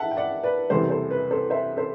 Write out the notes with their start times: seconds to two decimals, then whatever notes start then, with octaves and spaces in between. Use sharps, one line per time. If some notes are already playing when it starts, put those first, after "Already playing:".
Already playing: E5 F#5 A5
0.11 G5
0.17 D5 F#5
0.43 B4 D5
0.70 F#1 E2 C3 E3 G3 A4 C5
0.90 A4 C5
1.10 B4
1.31 A4 C5
1.50 C5 E5
1.77 A4 C5